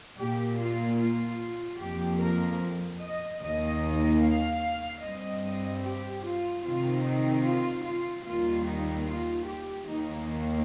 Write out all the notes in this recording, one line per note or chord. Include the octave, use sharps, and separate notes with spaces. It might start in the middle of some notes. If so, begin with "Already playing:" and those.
A#2 A#3 G4
F4
F4
F2 F3 A#3 G4
A#4
D#5
D#2 D#3 A#3 D#5
F5
G2 G3 C4 D#5
G4
F4
C3 D#3 C4 F4
D#4
F4
F4
D#2 D#3 G3 A#3 F4
D#4
F4
G4
D#2 D#3 A#3 D#4